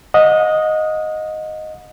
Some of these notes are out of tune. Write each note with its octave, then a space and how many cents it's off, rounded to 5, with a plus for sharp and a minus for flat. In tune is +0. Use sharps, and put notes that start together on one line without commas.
D#5 +0 F#5 -40